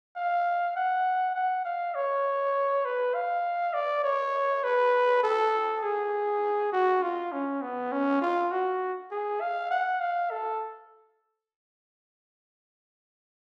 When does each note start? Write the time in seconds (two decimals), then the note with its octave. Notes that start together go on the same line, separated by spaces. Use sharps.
0.16 F5
0.76 F#5
1.36 F#5
1.65 F5
1.95 C#5
2.85 B4
3.15 F5
3.74 D5
4.04 C#5
4.64 B4
5.23 A4
5.83 G#4
6.73 F#4
7.02 F4
7.32 C#4
7.62 B3
7.92 C#4
8.21 F4
8.51 F#4
9.11 G#4
9.41 F5
9.71 F#5
10.01 F5
10.31 A4